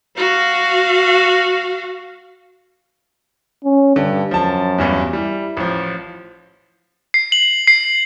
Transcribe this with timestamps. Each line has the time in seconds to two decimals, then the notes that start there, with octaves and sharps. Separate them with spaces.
0.17 F#4 F5
3.64 C#4
3.96 G2 D3
4.31 F#2 F3 A5
4.78 E2 G2 E3
5.13 G3 E4
5.57 A1 F3
7.14 C7
7.32 F#7
7.67 C7